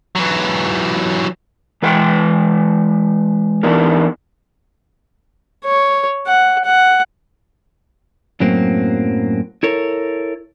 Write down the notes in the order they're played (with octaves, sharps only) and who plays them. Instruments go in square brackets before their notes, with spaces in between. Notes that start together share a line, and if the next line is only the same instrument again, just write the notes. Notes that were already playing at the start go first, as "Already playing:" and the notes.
[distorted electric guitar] E3 F#3
[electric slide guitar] E3 G#3 B4 F#5 G5
E3 B3 D4 D#4 A#4
[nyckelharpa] C#5
F#5
F#5
[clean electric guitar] F#2 A2 F#3 A#3 C4
E4 A4 A#4 C#5